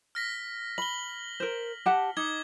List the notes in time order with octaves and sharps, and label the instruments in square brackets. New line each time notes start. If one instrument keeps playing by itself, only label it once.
[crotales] F6 A#6 B6
[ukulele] B5 [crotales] F#7 G7
[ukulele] A#4 C5
G4 F#5 A5
[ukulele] D#4 [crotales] D6 G#6 G7